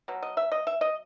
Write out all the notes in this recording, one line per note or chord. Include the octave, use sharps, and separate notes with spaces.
B2 F#3
D#5
E5
D#5
E5
D#5